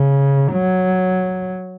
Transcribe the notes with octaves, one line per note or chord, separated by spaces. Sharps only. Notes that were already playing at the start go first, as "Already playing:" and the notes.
Already playing: C#3
F#3